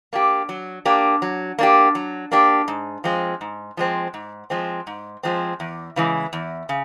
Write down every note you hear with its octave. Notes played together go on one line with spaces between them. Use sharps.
A#3 D4 G4
F#3
A#3 D4 G4
F#3
A#3 D4 G4
F#3
A#3 D4 G4
G#2
F3 G#3 C4
G#2
F3 G#3 C4
G#2
F3 G#3 C4
G#2
F3 G#3 C4
E2
C#3 E3 G#3
E2
C#3